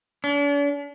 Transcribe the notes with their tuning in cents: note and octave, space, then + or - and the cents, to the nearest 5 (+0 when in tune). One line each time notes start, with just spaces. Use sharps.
D4 -45